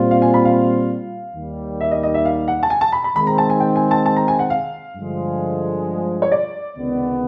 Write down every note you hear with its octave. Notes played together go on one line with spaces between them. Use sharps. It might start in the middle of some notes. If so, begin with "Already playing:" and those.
Already playing: A#2 G3 C4 F4
F5
G#5
B5
F5
D#2 D#3 G3
E5
D#5
D#5
E5
F5
F#5
A5
G#5
A5
B5
B5
D#3 G#3 C4 B5
A#5
A5
G#5
G5
G#5
A5
A5
A#5
G#5
F#5
F5
G2 D3 F3 G#3
C#5
D5
C#2 C3 D#3 G#3 B3